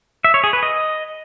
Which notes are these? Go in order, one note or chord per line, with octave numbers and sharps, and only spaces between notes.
E5
C#5
G#4
B4
D#5